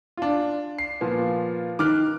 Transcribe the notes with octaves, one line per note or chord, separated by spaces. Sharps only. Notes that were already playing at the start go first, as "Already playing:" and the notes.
D4 F4
C7
A#2 F3 B3
D#3 D6 F6 F#6